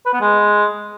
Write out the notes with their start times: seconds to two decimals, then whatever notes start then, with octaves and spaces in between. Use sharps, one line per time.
0.05 B4
0.13 B3
0.21 G#3